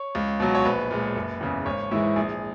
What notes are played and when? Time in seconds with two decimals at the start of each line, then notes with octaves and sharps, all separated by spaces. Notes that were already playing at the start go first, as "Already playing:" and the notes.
Already playing: C#5
0.15 C#2
0.40 B2 F#3
0.55 C#5
0.65 A#1 B4
0.91 A#2 G#3
1.16 F#1
1.41 E2 C#3
1.66 G#1 C#5
1.91 G#2 E3 G#3 E4
2.16 A#1 G#4